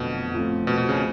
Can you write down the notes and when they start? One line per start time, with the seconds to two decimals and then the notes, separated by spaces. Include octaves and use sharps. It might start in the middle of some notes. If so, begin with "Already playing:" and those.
Already playing: F2 B2 D3 F#3 A3
0.33 A2 F3 A3 C4 F4
0.67 B2
0.77 B2
0.89 C#3